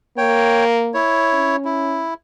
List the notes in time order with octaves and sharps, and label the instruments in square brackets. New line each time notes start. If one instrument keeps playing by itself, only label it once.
[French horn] A#3 [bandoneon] C#5 G5
[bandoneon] E4 C#5
[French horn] C#4
[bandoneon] E4